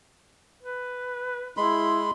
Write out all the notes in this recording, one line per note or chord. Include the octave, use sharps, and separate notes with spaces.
B4
G#3 E4 B5 C6